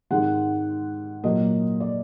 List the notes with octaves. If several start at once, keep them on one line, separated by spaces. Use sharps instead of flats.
G#2 D#3 G#3 C4 F#5
A#2 F#3 A#3 D#5
D5